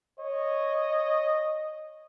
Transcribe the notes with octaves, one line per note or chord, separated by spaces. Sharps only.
C#5 D#5